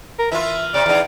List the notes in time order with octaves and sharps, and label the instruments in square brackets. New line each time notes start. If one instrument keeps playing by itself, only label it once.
[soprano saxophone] A#4
[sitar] E3 F4 [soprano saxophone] E5
[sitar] C3 [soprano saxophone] D5
[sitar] E2 D#4